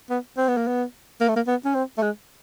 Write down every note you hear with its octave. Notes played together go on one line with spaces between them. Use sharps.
B3
C4
B3
A#3
B3
A#3
A3
A#3
B3
C#4
C4
A3
G#3